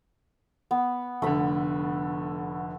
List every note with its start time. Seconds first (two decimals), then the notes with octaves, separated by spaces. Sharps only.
0.71 B3
1.22 F1 D3 A3 B5